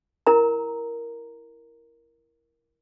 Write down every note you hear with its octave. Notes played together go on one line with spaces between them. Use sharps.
E4 A#4 A#5